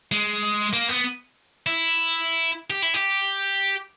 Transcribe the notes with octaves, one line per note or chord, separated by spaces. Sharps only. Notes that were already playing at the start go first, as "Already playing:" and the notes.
G#3
A#3
B3
E4
G4
E4
G4